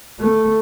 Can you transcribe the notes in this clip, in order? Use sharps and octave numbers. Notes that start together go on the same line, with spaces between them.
A3